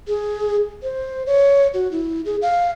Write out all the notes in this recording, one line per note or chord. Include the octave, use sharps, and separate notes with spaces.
G#4
C5
C#5
F#4
E4
G#4
F5